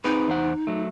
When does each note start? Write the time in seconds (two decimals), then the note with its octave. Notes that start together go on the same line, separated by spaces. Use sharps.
0.04 C4 D#4 G#4 B4
0.28 E2 C5 F#5
0.67 F#3 A3